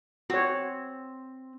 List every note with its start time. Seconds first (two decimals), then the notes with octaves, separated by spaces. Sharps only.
0.30 C4 F#4 C#5